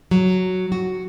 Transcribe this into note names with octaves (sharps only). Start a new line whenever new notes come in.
F#3
F#4